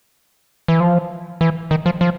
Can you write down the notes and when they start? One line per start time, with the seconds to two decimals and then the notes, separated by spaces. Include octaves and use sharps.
0.68 E3
0.80 F3
1.41 E3
1.71 D#3
1.86 F3
2.01 F3